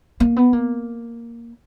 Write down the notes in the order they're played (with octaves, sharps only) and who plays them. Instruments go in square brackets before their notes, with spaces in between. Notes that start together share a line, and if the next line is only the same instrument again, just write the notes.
[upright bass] A#3
B3
A#3